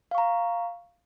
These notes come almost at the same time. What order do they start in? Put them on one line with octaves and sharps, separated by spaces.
F5 C#6 A#5